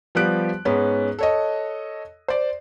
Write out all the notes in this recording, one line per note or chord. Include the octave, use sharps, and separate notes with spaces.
F3 G3 B3 G4 F#6 D7
G#2 B3 C#4
A4 C#5 D#5
C5 D5